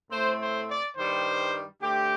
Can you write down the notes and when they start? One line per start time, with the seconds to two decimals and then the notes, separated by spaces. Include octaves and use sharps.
0.11 A2 A3 C4 C5
0.39 C5
0.68 D5
0.96 G2 D#3 G3 C5
1.81 D3 A3 C4 G4